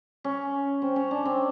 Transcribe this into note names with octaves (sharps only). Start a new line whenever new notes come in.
C#4
C4
C#4
D4
C4